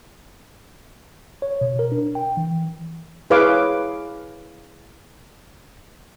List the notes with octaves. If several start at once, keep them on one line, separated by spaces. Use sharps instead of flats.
C#5
B2
A#4
D4
G5
E3
E4 G#4 B4 C#5 F5 D6